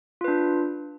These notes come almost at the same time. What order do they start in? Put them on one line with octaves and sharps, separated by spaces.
F4 B4 D4